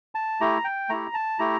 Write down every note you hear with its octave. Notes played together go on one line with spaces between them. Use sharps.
A5
A3 E4 G4 A#5
G5
A3 E4 G4 A#5
A5
A3 E4 G4 A#5